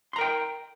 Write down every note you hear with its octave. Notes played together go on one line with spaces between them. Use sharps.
A#4 G5 A#5 C6